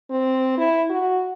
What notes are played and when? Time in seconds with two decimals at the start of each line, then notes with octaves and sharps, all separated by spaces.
0.10 C4
0.58 E4
0.90 F#4